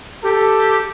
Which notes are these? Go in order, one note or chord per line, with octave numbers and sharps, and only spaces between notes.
G4 A4